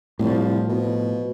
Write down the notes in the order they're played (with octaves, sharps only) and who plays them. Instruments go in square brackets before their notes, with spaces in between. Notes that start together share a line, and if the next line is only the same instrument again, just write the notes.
[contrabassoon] C2 [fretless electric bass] A2 F3
[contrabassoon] B2